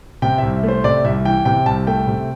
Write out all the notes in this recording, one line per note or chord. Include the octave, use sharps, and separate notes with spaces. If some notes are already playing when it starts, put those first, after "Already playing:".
C3 G5
C2 E5
A3
C5
C3 D5
C2 E5
E3 G5
C3 G5
C2 A5
A3 G5
C3